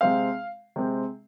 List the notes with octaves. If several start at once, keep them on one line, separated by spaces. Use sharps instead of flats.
C3 G#3 C4 F5
C3 G#3 C4